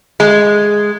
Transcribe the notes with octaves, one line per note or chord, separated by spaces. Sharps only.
G#3